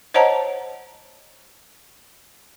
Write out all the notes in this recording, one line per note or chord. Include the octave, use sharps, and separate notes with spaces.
C5 C#5 D#5 F#5 A5 A#5